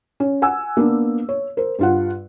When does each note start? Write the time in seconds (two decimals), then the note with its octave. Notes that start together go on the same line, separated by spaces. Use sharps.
0.20 C#4
0.42 F#5 G#5 E6
0.77 A#3 B3 D4
1.29 C#5
1.57 A#4 C5
1.79 G2 F4 F#5